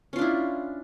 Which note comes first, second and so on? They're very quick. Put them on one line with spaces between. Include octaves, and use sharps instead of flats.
C#4 F4 D4 E4